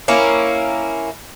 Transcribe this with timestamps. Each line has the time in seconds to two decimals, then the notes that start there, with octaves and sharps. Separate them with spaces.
0.08 A#3 C#4 E4